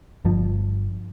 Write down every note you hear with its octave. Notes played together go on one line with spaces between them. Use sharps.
G1 G2 F3